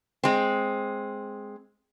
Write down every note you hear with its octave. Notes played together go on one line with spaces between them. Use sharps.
G#3 C4